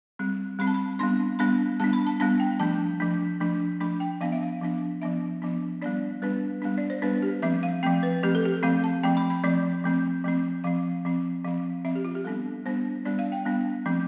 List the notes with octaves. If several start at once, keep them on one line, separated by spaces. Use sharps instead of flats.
G3 C4
G3 C4 B5
A5
B5
G3 B3 D4 C6
G3 B3 D4 B5
G3 B3 D4 A5
B5
A5
G3 B3 D4 A5
G5
F3 A3 D4 A5
F3 A3 D4
F3 A3 D4
F3 A3 D4 B5
G5
F3 B3 D4 F5
E5
F5
F3 B3 D4
F3 B3 D4 E5
F3 B3 D4
G3 B3 D4 D5
G3 B3 D4 B4
G3 B3 D4
D5
C5
G3 B3 D4 B4
G4
F3 A3 C4 E5
F5
F3 A3 C4 G5
B4
F3 A3 C4 G4
A4
G4
F3 A3 C4 F5
A5
F3 A3 C4 G5
B5
B5
F3 A3 C4 D5
F3 A3 C4
F3 A3 C4
F3 C4 F5
F3 C4
F3 C4 F5
F3 C4 E5
G4
F4
G4
G3 B3 D4 A4
G3 B3 D4 C5
G3 B3 D4 D5
F5
G5
G3 B3 D4
F3 A3 C4